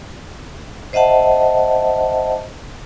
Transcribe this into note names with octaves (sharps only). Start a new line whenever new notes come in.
C5 D#5 E5 F#5 A5